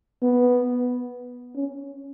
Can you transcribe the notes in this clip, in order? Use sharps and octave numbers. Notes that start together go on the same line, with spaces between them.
B3
C#4